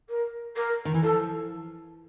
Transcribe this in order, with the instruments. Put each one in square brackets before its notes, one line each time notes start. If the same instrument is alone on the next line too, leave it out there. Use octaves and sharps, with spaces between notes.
[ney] A#4
A#4
[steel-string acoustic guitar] D#3
E3
[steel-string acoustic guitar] F3 [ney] A4